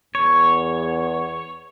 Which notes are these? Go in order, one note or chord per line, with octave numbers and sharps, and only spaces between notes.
E2 C#5